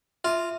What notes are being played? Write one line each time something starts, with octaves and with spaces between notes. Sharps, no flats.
F4 E5